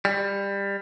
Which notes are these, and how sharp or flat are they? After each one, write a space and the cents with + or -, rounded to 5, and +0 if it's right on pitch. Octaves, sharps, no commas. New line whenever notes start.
G3 +20